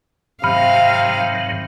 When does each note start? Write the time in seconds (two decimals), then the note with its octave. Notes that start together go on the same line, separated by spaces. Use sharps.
0.44 G#2 C3 D#3 F#3 F5 B5 F6